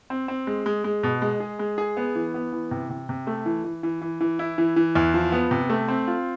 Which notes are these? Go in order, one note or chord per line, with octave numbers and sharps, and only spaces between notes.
C4
C4
G#3
G#3
G#3
B2
G#3
G#4
G#3
G#4
B3
E3
B3
E3
C3
C3
C3
A3
E3
E3
E3
E3
E3
E4
E3
E3
E2
F3
B3
C3
A3
C4
F4